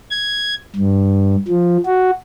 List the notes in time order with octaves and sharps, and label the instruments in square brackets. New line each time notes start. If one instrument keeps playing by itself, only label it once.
[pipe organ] G#6
G2
F3
F#4